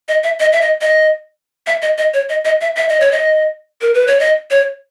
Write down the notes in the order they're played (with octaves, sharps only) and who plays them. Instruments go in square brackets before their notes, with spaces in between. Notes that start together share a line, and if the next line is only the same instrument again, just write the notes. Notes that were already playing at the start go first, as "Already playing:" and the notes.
[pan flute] D#5
E5
D#5
E5
D#5
D#5
E5
D#5
D#5
C#5
D#5
D#5
E5
E5
D#5
C#5
D#5
A#4
B4
C#5
D#5
C#5